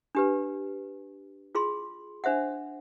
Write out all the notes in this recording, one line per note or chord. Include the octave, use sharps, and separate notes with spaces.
D4 G4 B4
F4 G#4 B5 C6
D4 C5 E5 F#5